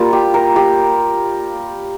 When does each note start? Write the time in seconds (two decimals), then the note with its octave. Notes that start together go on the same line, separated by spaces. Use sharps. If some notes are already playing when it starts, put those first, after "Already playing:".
Already playing: G3 A#3 F4
0.13 G4
0.34 A#4
0.56 G4